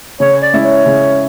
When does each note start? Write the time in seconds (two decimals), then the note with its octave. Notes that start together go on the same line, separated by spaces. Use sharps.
0.20 C#3 C#5
0.42 D5
0.53 G#3 C#4 E4
0.64 C#5
0.86 C#3